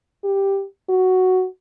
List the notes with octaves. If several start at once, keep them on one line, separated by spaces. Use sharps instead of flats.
G4
F#4